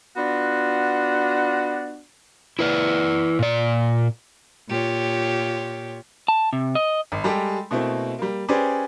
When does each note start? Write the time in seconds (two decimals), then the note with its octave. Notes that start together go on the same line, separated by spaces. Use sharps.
0.17 B3 D4 F4 F#4
2.59 E4 B4 D5
3.39 A#2 D5
4.69 A#2 F4 G4 C#5
6.28 A5
6.53 C3
6.75 D#5
7.12 G#1
7.24 G3 G#3 G4 A4
7.71 B2 A3 A#3 C4 E4
8.19 G3 A#3
8.48 C#4 G4 G#4 B4 C5 D5